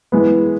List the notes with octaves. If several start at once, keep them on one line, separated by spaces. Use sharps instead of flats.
E3 G#3 B3